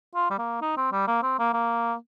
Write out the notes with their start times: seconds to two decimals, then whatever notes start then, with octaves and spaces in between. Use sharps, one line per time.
0.15 F4
0.31 G3
0.38 A#3
0.62 D#4
0.77 C4
0.92 G3
1.08 A#3
1.23 C4
1.39 A#3
1.53 A#3